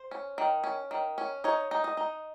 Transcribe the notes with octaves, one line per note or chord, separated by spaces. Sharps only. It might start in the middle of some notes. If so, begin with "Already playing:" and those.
Already playing: C5
C#4
D#3
C#4
D#3
C#4
D#4 C#5
D#4
D#5
D#4